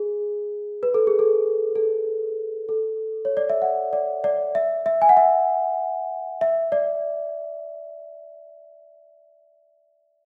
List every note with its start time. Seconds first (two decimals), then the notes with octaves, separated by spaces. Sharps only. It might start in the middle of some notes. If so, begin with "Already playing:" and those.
Already playing: G#4
0.83 B4
0.94 A4
1.07 G#4
1.19 A4
1.75 A4
2.69 A4
3.25 C#5
3.37 D5
3.50 E5
3.62 F#5
3.93 D5
4.24 D5
4.55 E5
4.86 E5
5.02 G#5
5.09 F#5
5.17 E5
6.41 E5
6.72 D5